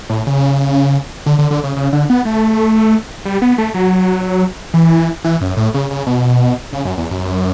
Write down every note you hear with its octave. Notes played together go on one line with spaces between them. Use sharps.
A2
C#3
D3
D3
D3
C#3
C#3
D3
B3
A3
G3
B3
A3
F#3
E3
E3
F#2
A2
C#3
C#3
B2
C#3
F#2
E2
F#2